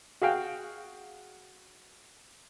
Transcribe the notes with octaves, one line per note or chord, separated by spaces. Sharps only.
F#4 G#4 F5 G5